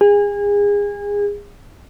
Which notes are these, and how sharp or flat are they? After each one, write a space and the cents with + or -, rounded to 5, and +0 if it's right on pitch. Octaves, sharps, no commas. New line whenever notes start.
G#4 -30